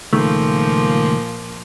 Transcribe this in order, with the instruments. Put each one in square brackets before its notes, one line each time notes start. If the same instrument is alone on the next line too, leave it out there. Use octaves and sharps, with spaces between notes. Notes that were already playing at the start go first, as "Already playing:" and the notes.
[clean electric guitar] C#2 D#3 A3 [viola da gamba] A#2 F3 A#3